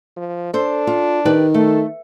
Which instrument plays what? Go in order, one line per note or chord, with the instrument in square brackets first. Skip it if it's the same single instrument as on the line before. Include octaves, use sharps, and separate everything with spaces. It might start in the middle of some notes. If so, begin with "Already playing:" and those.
[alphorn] F3
[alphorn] D4 [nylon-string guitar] A4 C5
[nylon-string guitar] F4
[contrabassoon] D#3 [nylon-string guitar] G4 B4 D5
[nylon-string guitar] A3 [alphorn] A4